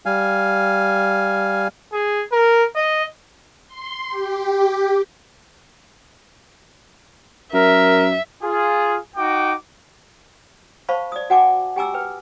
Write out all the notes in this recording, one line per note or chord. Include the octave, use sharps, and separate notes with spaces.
G3 F5 G#5
G#4
A#4
D#5
C6
G4
F#2 A#4 E5
F4 G#4
D#4 F#4 G5 D6
C5 F5 A5 B5 C#6
D5 D#6
F#4 F#5 G#5 A5 D6
G4 G5 G#5 A#5 D6 E6
B4 G5